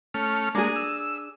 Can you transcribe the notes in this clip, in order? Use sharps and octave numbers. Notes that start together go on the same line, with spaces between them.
A3 C#4 F6
G#3 A#3 D4 G#4
E6